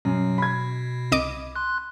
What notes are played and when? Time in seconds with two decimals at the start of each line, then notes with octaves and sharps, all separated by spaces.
0.05 F#2 B2
0.38 B5 G#6
1.12 C2 D#5 D6
1.56 C6 F#6